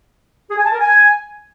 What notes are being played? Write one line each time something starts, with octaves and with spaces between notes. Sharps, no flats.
G#4
G#5
A5
A#4
G#5